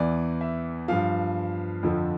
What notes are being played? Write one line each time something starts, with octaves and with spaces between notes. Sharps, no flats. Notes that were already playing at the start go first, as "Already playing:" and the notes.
Already playing: E2 E3 D5
E5
G2 F3 F5
F2 D3 F3